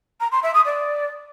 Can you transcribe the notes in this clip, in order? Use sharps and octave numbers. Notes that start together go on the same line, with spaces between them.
A#5
C6
E5
D#6
D5